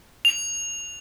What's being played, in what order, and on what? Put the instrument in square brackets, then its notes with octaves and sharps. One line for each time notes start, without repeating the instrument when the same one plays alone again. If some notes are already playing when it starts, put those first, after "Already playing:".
[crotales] F7